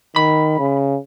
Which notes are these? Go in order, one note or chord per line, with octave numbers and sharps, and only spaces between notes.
D#3 B5
C#3